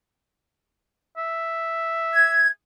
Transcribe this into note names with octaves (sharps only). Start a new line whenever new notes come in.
E5
G#6